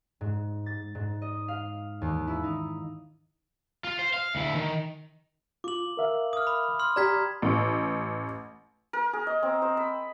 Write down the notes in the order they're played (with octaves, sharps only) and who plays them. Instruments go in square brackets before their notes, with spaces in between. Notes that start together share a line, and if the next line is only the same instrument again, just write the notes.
[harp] G#2
A6
G#2
D#5
F5
D#2
E4
D#4
[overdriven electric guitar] F4
C5
F5
D2 E4
D#3
[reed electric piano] F4 [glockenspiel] D6 F#7
[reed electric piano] A#4 E5 F5
[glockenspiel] D#6 F6
B5
C6 F6
[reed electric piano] G4 D5 [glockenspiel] A#5 G#6 B6
[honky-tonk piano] A1
[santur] A#4
G#4
D#5
C4
C5
B5